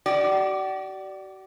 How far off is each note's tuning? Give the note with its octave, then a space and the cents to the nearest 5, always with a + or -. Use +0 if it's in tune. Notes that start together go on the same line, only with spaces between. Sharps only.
F#4 +45 D5 +0